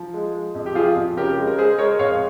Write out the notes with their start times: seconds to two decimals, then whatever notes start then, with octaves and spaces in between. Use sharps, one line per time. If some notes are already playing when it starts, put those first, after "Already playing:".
Already playing: F3
0.14 G#3
0.34 G#3
0.55 F2
0.66 G4
0.75 F3 F4 G#4
0.96 F2
1.17 C#3 G4 A#4
1.37 G#3
1.47 A#4
1.58 G#3 G#4 C5
1.78 G#3 A#4 C#5
1.99 F2 C#5 F5